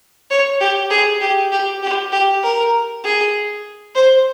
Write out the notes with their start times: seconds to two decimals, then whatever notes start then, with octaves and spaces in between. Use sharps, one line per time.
0.30 C#5
0.60 G4
0.90 G#4
1.21 G4
1.52 G4
1.83 G4
2.12 G4
2.43 A#4
3.04 G#4
3.95 C5